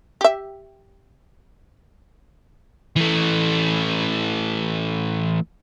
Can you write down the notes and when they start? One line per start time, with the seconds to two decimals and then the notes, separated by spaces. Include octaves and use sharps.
0.21 G4 E5
2.97 E3 A3